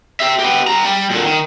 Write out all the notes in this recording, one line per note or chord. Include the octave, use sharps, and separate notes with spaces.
G4 E5
B3 G4
G3 A#5
G3
A#2 D3
D#3